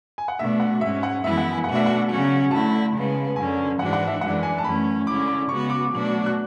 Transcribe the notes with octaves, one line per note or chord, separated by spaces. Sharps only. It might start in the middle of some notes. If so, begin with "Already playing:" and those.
G#5
F#5
B2 A3 D4 F#4 E5
F#5
G#2 G#3 C#4 E5
F#5
F#2 E3 G#3 B3 E4 E5
F#5
G#5
B2 A3 D4 F#4 F#5
E5
F#5
C#3 F#3 C#4 F#4
D3 A3 E4 A5
C#3 G#3 B3
F#2 D3 F#3 C#4 G#5
G#2 E3 G#3 D4 F#4 F#5
F#5
E5
F#2 E3 G#3 D4 F#5
G#5
A5
F#2 E3 A3 C#4 B5
D3 G#3 C#4 E4 D6
D6
C#3 G#3 B3 F#4 C#6
D6
B2 F#3 A3 D4 F#4
F#6